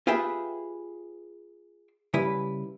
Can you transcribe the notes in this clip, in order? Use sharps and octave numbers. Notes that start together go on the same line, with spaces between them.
F4 G4 G#4 B4 E5 G5
C#3 G3 E4 B4